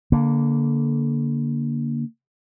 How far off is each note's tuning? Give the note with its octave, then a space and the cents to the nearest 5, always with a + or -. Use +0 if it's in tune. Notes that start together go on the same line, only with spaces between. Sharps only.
D3 -25 A#3 +0